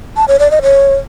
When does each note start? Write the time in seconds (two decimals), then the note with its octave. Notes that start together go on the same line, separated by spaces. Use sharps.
0.17 A5
0.28 C#5
0.39 D5
0.51 D#5
0.62 C#5